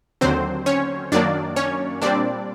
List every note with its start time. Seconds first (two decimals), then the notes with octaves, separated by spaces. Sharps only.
0.21 D#2 D3 F#3 C4 C5
0.66 C#4 C#5
1.12 F#2 D#3 F#3 A#3 D4 D5
1.56 C#4 C#5
2.02 A#2 G3 C4 D4 D5